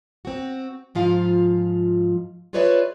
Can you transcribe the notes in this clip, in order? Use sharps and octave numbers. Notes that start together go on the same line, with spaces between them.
C4 F#4
G#2 F3 F4 F5
F4 G#4 B4 C#5 D5 E5